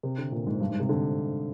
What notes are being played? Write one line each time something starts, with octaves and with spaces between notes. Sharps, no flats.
C3
D3
A#2
G#2
G2
G#2
C3
D3